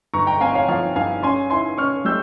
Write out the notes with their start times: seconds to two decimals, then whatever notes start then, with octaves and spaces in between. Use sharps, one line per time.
0.14 G1 A#5 C#6
0.27 G5 A#5
0.41 C4 F5 G#5
0.55 C#5 F5
0.68 F3 C#5 F5
0.95 G2 F5 G#5
1.23 C#4 G#5 C6
1.50 E4 G#5 C6
1.78 C#4 C#6 F6
2.05 G3 E6 G6